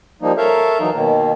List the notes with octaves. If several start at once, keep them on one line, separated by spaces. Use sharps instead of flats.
F3 G3 A#3 D#4
A4 A#4 C#5 E5 F5
E3 F#3 D#4
B2 D#3 A#3